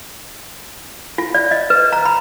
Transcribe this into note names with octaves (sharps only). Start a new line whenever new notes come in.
F4
D5
D#5
B4
A#5
B5